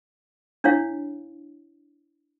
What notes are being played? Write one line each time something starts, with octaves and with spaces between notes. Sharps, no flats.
D4 E4 C#5 F5